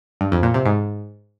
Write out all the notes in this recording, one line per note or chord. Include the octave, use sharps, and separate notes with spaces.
G2
F2
A#2
C3
G#2